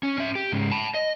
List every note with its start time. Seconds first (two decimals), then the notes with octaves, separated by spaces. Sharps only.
0.03 C#4
0.18 C#4 E5
0.35 G4
0.52 G#2 C#3
0.71 A5 B5
0.94 D#5